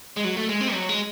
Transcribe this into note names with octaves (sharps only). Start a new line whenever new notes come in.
G#3
F#3
A3
G#3
C4
F#3
G#3